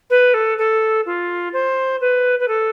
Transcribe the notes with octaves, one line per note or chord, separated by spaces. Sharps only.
B4
A4
A4
F4
C5
B4
B4
A4